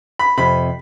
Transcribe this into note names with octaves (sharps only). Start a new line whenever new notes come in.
B5
F2 C3 B5